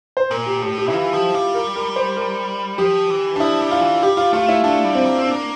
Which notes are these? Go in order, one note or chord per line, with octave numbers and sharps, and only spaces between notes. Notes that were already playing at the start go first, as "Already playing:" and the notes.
C5
A#2 A#4
G4
A2 G4
G4
E4
E3 F4
F3 G4
G3 F4
A#4
A#4
C5
A#4
F3 G4
E3
D4
F3 E4
G3
F4
E3
G3 G4
F4
A3 F4
E4
A3 D4
G3
C4
A#3
C4
D4
A#3